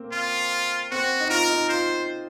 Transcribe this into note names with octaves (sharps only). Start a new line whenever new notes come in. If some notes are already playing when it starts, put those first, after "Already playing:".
Already playing: A#3 C4
F4
C4 F#4
D#4
F4 A#4
D#4
F4 C5